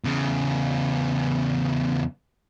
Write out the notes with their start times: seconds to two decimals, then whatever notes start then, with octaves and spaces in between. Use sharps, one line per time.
0.04 E2 C#3